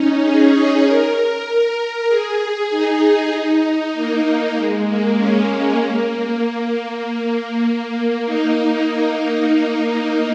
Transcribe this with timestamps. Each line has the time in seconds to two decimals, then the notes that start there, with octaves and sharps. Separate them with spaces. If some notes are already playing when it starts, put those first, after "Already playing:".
Already playing: C#4 D#4
0.23 G#4
0.53 C#5
0.85 A#4
1.46 A#4
2.08 G#4
2.70 D#4
3.94 A#3
4.56 G#3
4.86 A#3
5.17 C#4
5.79 A#3
8.26 D#4
8.87 D#4